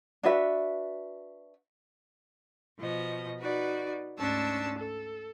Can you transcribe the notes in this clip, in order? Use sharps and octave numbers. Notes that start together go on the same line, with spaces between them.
D4 F#4 B4 E5
B2 F3 D#5
D#4 F#4 B4 D5
D2 G#2 C#4 D4 A5 E6
A4